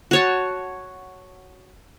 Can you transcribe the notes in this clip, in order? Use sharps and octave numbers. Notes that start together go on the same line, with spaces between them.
F#4 C#5 A5